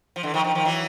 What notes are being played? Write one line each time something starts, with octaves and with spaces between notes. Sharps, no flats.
F3
D3 E3
D#3 F3
D#3 F3
D#3 F3
E3 F#3